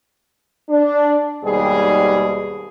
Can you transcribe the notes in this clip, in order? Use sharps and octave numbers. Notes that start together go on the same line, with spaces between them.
D4
D#2 G#2 B2 G3 G#4